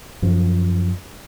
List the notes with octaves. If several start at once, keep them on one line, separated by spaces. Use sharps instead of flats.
F#2 F3